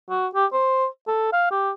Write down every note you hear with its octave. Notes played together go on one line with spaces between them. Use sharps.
F#4
G4
C5
A4
F5
G4